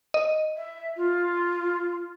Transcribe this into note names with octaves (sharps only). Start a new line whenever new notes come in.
D#5
E5
F4